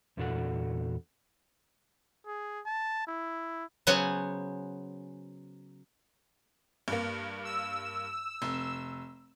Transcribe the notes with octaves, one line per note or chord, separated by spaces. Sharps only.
E2 A#2 D4 F#4 A4 F#5
G#4
A5
E4
C#3 F#3 B3 C5 F#5 G#5
G2 A#3
E6
F1